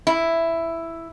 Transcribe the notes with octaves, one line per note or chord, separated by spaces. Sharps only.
E4